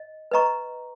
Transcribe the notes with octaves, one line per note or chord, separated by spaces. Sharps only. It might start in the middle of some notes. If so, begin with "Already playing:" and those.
Already playing: D#5
B4 D#5 A#5 C#6